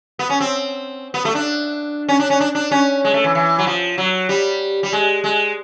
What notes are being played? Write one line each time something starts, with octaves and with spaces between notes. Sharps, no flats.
B3
C#4
C4
B3
A3
D4
C#4
D4
C#4
D4
D4
C#4
G#3
A3
E3
E3
F#3
F3
F#3
G3
G3
G#3
G#3